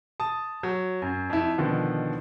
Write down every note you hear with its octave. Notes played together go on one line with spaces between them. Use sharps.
A5 D#6
F#3
F#2
F2 E4
B2 D3 D#3 F3